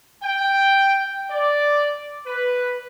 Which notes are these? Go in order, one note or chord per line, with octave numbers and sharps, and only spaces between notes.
G5
D5
B4